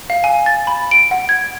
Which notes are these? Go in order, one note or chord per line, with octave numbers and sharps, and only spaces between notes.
F5
G#5
A6
B5
D7
F#5
G#6